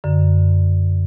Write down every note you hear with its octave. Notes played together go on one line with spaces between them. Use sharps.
F#2 D3